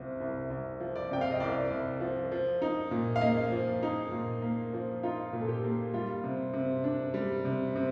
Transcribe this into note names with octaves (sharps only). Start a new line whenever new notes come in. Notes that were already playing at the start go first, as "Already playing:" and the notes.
Already playing: C2 C3 F3
C2
C2
F3
D5
C3 G5
F5
D#5
C2 D5
C2
F3
F3
D#4
A#2
F5
A#3 D#5
F3
D#4
A#2
A#3
F3
D#4 F4
A#2
A4
G4
A#3
G3 F4
C3
C3
D4
G3
C3
C3